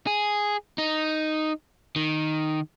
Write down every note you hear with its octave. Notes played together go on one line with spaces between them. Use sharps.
G#4
D#4
D#3